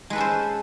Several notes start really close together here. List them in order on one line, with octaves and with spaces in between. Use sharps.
G#3 B4 A4 C#4 C5